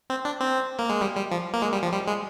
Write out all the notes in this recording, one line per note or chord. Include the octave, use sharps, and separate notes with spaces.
C4
D4
C4
A#3
G#3
G3
G3
F3
A#3
G#3
G3
F3
G3
G#3